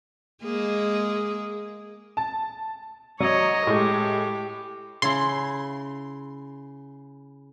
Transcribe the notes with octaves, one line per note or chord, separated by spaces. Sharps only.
G#3 A#3 G#4
A5
F#3 C#5 D#5
A2 G#3 G4
C#3 E4 C6